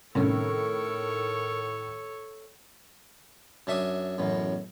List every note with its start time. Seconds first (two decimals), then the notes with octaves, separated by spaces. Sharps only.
0.15 A2 C3 D#3 G3 C#4 A4 A#4 C#5
3.67 F#2 D4 E5 C#6 D#6
4.18 A1 F#2 B2